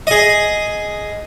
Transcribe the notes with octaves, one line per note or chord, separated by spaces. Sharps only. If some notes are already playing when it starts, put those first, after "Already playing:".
G#4 D#5